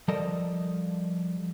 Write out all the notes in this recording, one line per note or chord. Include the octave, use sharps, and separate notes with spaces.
F3 G3 A4 A#4 D#5